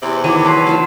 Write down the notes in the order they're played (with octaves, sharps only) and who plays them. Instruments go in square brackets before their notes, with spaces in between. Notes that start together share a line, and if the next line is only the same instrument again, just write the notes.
[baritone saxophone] E2 [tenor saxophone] C3
[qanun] D#3 E3 C#6 [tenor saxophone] F#3 [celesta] D6 D#7
[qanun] B4 D6 [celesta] A5 C6 C7
[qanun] F4 C5 F5